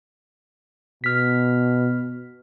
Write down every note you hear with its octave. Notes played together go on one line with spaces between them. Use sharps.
B2 F6 B6